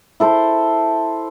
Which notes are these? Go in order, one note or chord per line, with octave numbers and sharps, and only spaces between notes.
E4 A4 C5